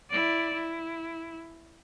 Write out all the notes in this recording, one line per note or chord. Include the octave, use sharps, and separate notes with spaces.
E4 D5
E4